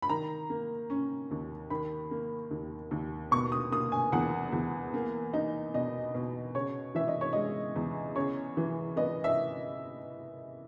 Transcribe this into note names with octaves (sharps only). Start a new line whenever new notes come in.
B5
D#3 A#5
A#3
C#4
D#2
D#3 B5
A#3
D#2
D#2
B2 C#6
D#6
A#3 D#6
G#5
E2 F#5
E2
A#3
D#4
B2 D#5
B2
C#3 C#5
E3 E5
D#5
C#5
G#3 D#5
E2
C#3 C#5
E3
B3 D#5
E5